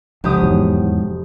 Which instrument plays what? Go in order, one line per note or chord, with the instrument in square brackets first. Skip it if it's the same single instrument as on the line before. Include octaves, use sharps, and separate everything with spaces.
[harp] F1 G4 D#6 [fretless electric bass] C#2
[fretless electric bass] E2 G#2 F#3